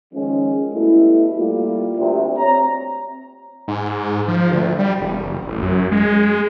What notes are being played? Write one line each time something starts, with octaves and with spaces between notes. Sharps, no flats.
D#3 F3 G#3 C#4
B2 G3 A3 E4
G3 A3 A#3 F4
D2 C3
C4 C#5 A#5
G#2
F3
D2
G3
E1
F#1
A1
F#2
G#3